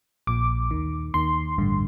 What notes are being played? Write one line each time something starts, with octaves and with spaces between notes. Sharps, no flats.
A#1 A#2 D6
D#2 D#3
D#2 D#3 C6
A1 G2 D3